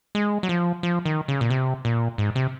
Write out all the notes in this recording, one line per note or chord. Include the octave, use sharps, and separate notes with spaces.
G#3
F#3
F3
F3
D#3
C#3
A#2
C3
A#2
G#2
C3